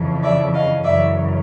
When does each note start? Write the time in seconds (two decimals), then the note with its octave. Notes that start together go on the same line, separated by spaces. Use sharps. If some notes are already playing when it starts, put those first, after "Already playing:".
Already playing: F2 C#3 E3
0.23 D5 E5
0.53 D#5 F5
0.84 F#2 C#3 E3 D5 E5